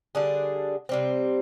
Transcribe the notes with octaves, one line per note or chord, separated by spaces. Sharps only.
D3 G3 D4 G#4
C3 G3 C4